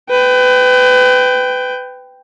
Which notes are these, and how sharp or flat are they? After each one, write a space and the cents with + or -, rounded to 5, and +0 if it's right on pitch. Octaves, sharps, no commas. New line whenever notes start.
B4 +30 G5 +0